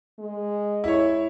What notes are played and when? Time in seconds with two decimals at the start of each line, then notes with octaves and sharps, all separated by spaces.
0.19 G#3
0.84 E4 C#5